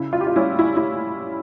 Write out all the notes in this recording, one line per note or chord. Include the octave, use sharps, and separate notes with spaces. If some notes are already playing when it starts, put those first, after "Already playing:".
Already playing: C#3 E4
F4
G4
F4
G3 C#4 E4
E4
E4